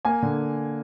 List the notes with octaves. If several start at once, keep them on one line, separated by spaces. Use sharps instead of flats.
A#3 G#5
D3